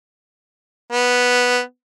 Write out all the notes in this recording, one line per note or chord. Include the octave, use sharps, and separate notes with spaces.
B3